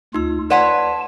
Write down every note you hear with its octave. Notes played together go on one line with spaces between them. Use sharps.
D2 D#4 F4 E6
B4 C#5 D5 F#5 A5 C6 B6